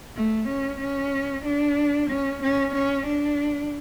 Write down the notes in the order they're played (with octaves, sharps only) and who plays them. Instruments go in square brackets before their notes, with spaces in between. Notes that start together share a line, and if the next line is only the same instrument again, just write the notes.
[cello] A3
C#4
C#4
D4
C#4
C#4
C#4
D4